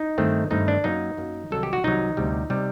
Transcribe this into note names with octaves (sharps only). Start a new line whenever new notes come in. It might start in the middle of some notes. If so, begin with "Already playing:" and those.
Already playing: D#4
G2 D#3 A3 C4
G2 D#3 A3 C4 D#4
D4
F#2 F#3 A#3 D#4
F#2 F#3 A#3
C2 C3 D#3 F#3 A4
G4
F#4
C2 C3 D#3 F#3 D#4
D2 C3 G3
C3 G3